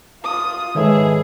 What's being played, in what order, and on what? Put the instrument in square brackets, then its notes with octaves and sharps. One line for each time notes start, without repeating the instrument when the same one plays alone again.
[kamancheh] F4 D#6
[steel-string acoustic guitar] G#2 C#5 E5 [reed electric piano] D#3 A4 B4 [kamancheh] G#4